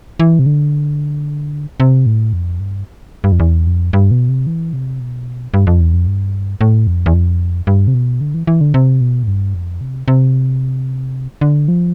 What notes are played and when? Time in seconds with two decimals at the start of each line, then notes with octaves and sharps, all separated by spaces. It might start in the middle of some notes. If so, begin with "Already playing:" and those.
0.19 E3
0.39 C3
0.46 D3
1.80 C3
2.06 A2
2.33 F2
2.60 G2
3.24 G2
3.32 F2
3.40 E2
3.67 F2
3.93 G2
4.11 B2
4.29 C3
4.47 E3
4.73 C3
5.00 B2
5.54 G2
5.67 F2
5.80 E2
5.94 F2
6.07 G2
6.61 A2
6.87 F2
7.06 E2
7.14 F2
7.67 G2
7.88 C3
7.94 B2
8.21 D3
8.34 E3
8.47 E3
8.61 D3
8.74 C3
9.01 B2
9.23 A2
9.27 G2
9.55 F2
9.81 C3
10.08 C3
11.41 D3
11.68 F3